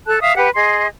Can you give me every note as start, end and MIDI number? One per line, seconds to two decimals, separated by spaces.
0.07 0.18 69
0.07 0.18 81
0.07 0.18 90
0.20 0.35 76
0.20 0.35 77
0.20 0.35 87
0.35 0.48 67
0.35 0.48 71
0.35 0.48 78
0.54 0.86 68
0.54 0.86 75
0.54 0.86 84